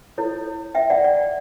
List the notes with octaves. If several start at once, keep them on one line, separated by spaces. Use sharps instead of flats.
E4 A4 C#5
E5 G5
D5 F#5
D5